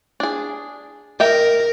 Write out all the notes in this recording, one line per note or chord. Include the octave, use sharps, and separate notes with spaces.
D4 G#4
A#4 D#5 E5 G5